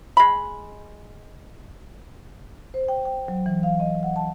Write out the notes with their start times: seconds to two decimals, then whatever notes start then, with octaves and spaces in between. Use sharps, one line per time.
0.17 G#3 B5
2.74 C5
2.88 G5
3.05 G5
3.28 F#3
3.46 E3
3.63 F5
3.80 D#5
4.03 F#5
4.16 A5